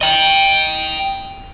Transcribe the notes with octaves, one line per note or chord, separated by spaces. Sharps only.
D#5 G5